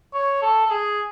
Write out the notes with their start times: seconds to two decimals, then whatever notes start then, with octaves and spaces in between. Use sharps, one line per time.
0.14 C#5
0.42 A4
0.66 A4
0.71 G#4